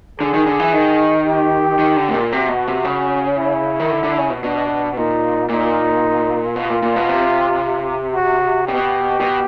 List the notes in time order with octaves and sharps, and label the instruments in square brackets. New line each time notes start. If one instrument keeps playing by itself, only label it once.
[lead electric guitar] D3 [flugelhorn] G#4
[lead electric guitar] D#3
D3
E3
D#3
[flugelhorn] G4
[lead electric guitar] D#3
D3
A2
A#2
[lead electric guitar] C3 [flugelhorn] F#4
[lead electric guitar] B2
C3
C#3
[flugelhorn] E4
[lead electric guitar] D#3
D3
D3
C#3
B2
[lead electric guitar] B2 [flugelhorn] D4
[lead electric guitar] A#2 [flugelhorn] D#4
[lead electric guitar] A#2 [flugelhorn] D#4
[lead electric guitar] B2 [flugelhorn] F4
[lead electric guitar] A#2
A#2
B2
C3
[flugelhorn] F#4
[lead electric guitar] B2 [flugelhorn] G4
[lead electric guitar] B2